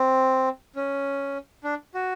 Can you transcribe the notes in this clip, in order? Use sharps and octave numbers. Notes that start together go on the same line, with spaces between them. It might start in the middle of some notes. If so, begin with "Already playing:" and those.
Already playing: C4
C#4
D4
F#4